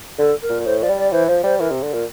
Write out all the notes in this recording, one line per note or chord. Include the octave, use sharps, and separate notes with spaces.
D3 A4
A#4
A#2
A2 C5
F3 D5
G3
D5
E3 C5
F3 C5
G3 C5
E3 A#4
C3
D3
A#2 A#4